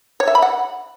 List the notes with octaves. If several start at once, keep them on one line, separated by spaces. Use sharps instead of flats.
C#5
E5
B5
F#5